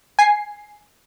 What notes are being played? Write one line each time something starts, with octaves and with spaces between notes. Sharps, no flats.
G#5 C7